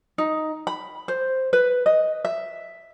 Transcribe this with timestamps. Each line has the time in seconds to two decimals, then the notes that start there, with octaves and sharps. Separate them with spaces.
0.18 D#4
0.67 B5
1.08 C5
1.53 B4
1.86 D#5
2.25 E5